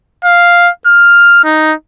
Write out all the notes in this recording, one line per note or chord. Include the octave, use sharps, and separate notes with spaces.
F5
F6
D#4